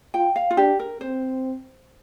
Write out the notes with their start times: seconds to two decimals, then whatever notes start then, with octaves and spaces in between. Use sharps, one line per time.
0.14 F4 G5
0.36 F5
0.51 F4
0.57 D4 G4
0.79 A#4
1.01 C4 C5